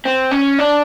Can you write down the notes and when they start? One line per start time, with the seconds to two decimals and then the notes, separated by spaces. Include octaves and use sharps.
0.05 C4
0.31 C#4
0.59 D4